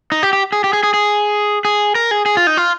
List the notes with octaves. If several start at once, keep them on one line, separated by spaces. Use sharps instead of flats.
D#4
G4
G4
G#4
G4
G#4
G#4
G#4
G#4
A#4
G#4
G#4
F4
D#4
F4